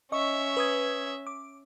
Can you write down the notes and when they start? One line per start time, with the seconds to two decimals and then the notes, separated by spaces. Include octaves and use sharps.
0.12 C#4 D#5 E5 C#6
0.57 B4 D#6 G#6
1.27 D6